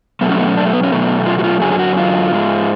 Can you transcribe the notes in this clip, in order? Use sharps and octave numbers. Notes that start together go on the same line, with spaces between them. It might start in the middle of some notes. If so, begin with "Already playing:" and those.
B2 F#3 A3 B3
C#4
B3
C#4
D4
A3
B3
C#4
B2 F#3 A3 B3
F4
F#4
F4
F#2 D3 F#3 G#4
G#4
F#4
F4
G#2 G#3